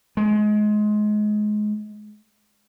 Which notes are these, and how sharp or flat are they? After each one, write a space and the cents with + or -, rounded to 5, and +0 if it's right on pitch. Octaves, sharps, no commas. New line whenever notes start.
G#3 +25